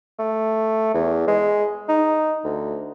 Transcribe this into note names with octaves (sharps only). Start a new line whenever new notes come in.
A3
E2
G#3
D#4
D2